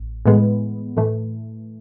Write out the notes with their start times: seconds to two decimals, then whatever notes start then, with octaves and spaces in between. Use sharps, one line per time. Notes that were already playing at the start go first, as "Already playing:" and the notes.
Already playing: A1
0.25 A2 E3 G#3 B3
0.97 A2 E3 A3